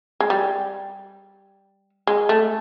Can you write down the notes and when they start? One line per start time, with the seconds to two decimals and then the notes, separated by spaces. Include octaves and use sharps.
0.20 G#3
0.30 G3
2.07 G#3
2.29 A3